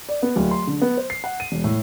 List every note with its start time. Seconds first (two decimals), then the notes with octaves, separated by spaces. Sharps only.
0.09 D5
0.23 B3
0.36 D1
0.51 C6
0.67 D3
0.82 B3
0.97 C5
1.10 C7
1.24 F#5
1.40 D#7
1.52 E1
1.64 A2